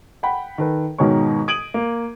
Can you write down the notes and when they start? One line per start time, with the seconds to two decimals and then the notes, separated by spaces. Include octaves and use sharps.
0.23 F#5 G5 B5
0.58 D#3 A4 B4
0.98 G#2 B2 D#3 A#4 C#5 C#6
1.48 D#6 G#6 D7 D#7 F#7
1.74 A#3